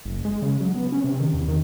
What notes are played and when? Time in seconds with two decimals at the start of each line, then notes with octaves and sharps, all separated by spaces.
0.05 F#1
0.25 G#3
0.42 C#3
0.60 F#3
0.75 B3
0.92 C#4
1.04 C3
1.20 D#3
1.34 E2
1.48 D#3